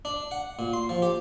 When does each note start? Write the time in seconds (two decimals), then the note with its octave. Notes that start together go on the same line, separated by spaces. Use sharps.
0.05 D4
0.31 F#5
0.59 A#2
0.73 C6
0.89 F3
1.02 G4